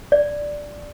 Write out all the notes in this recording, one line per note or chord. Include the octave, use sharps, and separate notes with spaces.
D5